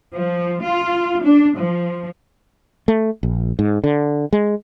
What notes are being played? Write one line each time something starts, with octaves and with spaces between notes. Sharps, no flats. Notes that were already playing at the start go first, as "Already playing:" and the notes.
F3
F4
D4
F3
A3
A#1
G#2
D3
G#3